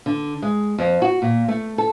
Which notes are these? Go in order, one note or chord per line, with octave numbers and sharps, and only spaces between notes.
D3
G#3
F2
F#4
A#2
A3
A4